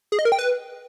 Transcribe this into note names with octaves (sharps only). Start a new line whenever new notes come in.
G#4
D#5
A#4
G5
B4